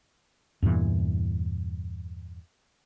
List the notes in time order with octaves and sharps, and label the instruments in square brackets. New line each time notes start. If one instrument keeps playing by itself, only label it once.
[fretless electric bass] E2 G2 A#2 E3